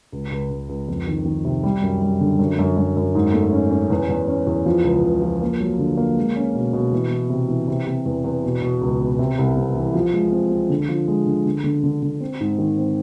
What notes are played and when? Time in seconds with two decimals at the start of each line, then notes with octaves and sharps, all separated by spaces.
0.12 C#2
0.31 C#2
0.50 C#2
0.69 C#2
0.88 F2
1.07 D#3
1.25 D#3
1.45 C3
1.63 G3
1.82 F#2
2.02 G3
2.21 D3
2.39 F#2
2.59 F#2
2.77 F#2
2.97 F#2
3.15 G#2
3.33 A3
3.53 C#4
3.71 C#4
3.90 E2
4.09 E2
4.28 C#4
4.47 E2
4.66 F3
4.84 C#2
5.03 C#2
5.22 F3
5.41 A#3
5.60 F#3
5.79 D3
5.97 A#3
6.17 G#3
6.36 C#4
6.55 B2
6.73 B2
6.93 E3
7.11 E3
7.30 C3
7.49 E3
7.68 C3
7.87 C3
8.06 E2
8.24 E2
8.43 B2
8.62 B2
8.81 C#2
8.99 B2
9.19 C3
9.38 C2
9.57 C3
9.75 E3
9.94 F3
10.13 G#3
10.32 C4
10.50 C4
10.70 D3
10.88 F3
11.08 G#3
11.26 D3
11.46 D3
11.64 D3
11.84 D3
12.02 D3
12.21 C4
12.40 G#2
12.58 D#3
12.78 C4